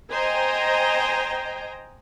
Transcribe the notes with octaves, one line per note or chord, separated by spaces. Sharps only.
C5 D#5 G5 G#5 A#5